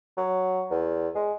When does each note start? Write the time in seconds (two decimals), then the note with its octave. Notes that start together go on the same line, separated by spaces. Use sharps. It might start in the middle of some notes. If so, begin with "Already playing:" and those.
0.17 F#3
0.71 E2
1.15 G#3